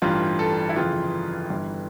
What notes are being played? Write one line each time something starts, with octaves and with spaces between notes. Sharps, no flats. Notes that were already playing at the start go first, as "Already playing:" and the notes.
A1 G2 E3 F4
A4
E4
G1 F2 C#3 E3 F4
G1 G2 E3